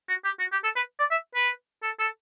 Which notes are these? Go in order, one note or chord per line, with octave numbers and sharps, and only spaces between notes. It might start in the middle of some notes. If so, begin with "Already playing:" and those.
F#4
G4
F#4
G4
A4
B4
D5
E5
B4
A4
A4